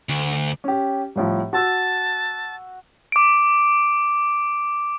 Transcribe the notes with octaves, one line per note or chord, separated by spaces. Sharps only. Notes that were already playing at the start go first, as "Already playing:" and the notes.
D2
C#4 G4
C2 A2 F3
F#4 A5 E6
D6 D7